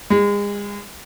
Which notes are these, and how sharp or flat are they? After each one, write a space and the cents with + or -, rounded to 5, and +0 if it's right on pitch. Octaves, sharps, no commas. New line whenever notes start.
G#3 -35